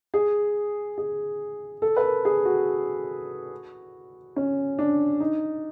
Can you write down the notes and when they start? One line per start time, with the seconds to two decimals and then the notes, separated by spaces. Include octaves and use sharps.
0.14 G#4
0.98 G#4
1.82 A4
1.97 B4
2.04 A#4
2.25 G#4
2.45 F#4
4.36 C#4
4.79 D4
5.20 D#4